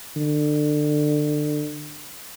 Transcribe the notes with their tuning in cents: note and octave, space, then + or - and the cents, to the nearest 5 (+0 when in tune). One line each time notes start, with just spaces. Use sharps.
D3 +25